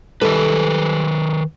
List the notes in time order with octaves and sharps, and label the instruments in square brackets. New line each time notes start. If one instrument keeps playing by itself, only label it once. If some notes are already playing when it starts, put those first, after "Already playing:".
[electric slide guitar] D#3 B4 [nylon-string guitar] G3 A4